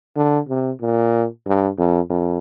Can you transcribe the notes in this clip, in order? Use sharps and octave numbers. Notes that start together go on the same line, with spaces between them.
D3
C3
A#2
G2
F2
F2